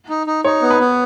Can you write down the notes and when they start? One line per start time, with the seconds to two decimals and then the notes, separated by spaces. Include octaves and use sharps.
0.09 D#4
0.27 D#4
0.44 D#4 C#5
0.62 B3
0.70 B4
0.80 B3